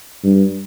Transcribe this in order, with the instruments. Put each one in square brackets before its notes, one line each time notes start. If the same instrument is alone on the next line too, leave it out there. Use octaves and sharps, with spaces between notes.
[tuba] G2